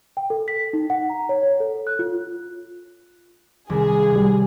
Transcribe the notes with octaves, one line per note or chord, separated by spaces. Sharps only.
G5
A4
B6
D#4
F#5
A#5
C#5
C#5
A4
F#6
F4
C2 D#3 G#4
C#2 G3